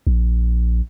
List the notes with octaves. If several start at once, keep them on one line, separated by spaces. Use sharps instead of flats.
A#1